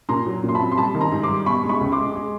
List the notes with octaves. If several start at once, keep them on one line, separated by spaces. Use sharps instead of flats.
A#2 A#5 C6
F#3
A#2
C6
A5 B5
C4
C6
G3 A5 B5
D#3
A#5 C6
G#2
C6 D6
G3
B2 B5 C#6
G#3
B5 C#6
C#2
C6 D6
G#3
G#3